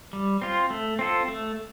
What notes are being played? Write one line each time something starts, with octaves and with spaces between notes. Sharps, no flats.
G3
C4 F4
A3
C4 F4 A4
A3